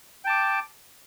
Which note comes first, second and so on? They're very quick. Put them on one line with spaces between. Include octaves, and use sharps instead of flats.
G5 A5 D6